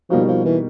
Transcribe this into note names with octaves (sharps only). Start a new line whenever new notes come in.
B2 F3 G3 A#3 D#4 F#4
F3
E3